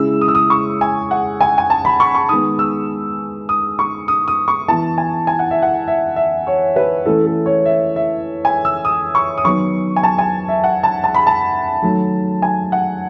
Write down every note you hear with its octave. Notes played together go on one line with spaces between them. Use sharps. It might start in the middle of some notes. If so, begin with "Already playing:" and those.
Already playing: C#3 G#3 C#4 E4 E6
D#6
E6
D#6
C#6
G#5
F#5
G#5
G#5
A5
B5
C#6
C#6
D#3 G#3 B3 D#6
E6
D#6
C#6
D#6
D#6
C#6
E3 B3 E4 A5
G#5
G#5
F#5
E5
F#5
E5
E5
C#5
B4
E3 A3 C#4 E4 A4
A4
C#5
E5
E5
G#5
E6
D#6
C#6
D#6
D#3 F#3 B3 C#6
G#5
A5
G#5
E5
F#5
A5
A5
B5
A5
D#3 F#3 A3
G#5
F#5